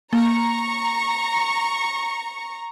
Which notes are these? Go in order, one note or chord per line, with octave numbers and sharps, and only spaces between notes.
A#3 A#5 C#6